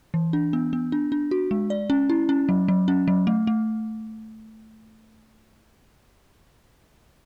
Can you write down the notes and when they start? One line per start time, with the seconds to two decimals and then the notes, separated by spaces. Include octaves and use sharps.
0.14 E3
0.33 D4
0.53 B3
0.73 B3
0.92 D4
1.12 D4
1.31 F#4
1.51 G#3
1.70 D5
1.90 C#4
2.10 E4
2.29 C#4
2.49 F#3
2.68 F#3
2.88 C#4
3.08 F#3
3.27 A3
3.47 A3